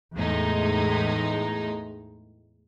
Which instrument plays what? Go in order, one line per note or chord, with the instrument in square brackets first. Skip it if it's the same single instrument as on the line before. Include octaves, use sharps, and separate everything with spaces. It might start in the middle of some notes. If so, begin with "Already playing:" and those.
[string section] E2 A2 G#3 D#4